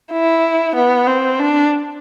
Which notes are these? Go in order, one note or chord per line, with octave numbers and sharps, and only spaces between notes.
E4
B3
C4
D4